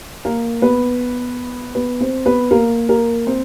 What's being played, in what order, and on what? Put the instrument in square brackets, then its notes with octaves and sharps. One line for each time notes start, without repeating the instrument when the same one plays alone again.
[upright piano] A#3 A#4
B3 B4
B3 B4
C4 C5
B3 B4
A#3 A#4
A#3 A#4
C4 C5